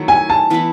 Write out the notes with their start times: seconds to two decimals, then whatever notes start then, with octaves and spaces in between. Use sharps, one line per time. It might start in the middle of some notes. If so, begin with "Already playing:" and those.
Already playing: D#3 F#3 A3 E4
0.08 G#5
0.30 A5
0.50 E3 B3 E4 B4